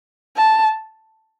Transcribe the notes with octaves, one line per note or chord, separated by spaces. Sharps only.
A5